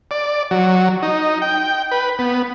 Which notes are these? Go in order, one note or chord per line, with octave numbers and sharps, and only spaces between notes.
D5
F#3
D#4
G5
B4
B3